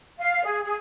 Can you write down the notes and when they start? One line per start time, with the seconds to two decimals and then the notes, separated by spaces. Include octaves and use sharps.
0.19 F5
0.44 G#4
0.64 G#4